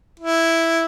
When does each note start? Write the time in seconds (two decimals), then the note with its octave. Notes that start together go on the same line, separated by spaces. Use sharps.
0.19 E4